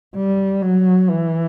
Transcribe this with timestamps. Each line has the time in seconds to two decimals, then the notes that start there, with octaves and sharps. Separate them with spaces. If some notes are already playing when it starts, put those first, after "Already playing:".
0.16 G3
0.62 F#3
1.10 E3